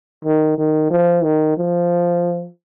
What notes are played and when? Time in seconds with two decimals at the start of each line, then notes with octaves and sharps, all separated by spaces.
0.25 D#3
0.58 D#3
0.91 F3
1.24 D#3
1.57 F3